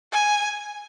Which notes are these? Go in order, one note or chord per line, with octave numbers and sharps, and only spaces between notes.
G#5